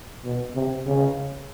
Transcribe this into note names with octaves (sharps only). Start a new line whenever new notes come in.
B2
C3
C#3